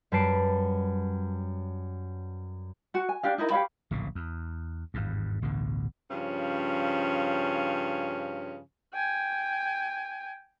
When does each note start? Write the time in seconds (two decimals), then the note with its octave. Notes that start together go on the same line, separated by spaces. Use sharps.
0.12 F#2 G3 B4 A5 C7 D7
2.94 F#4 F#5
3.09 G#5
3.23 D4 G4 F5
3.38 D#4 E4 A#4 D#5
3.50 G4 C#5 F5 B5
3.91 D1 A#1 A#2 C#3
4.15 E2
4.94 G#1 E2 G2
5.42 A1 D2 B2 D3
6.11 G2 C#3 F3 C#4
8.94 G5 G#5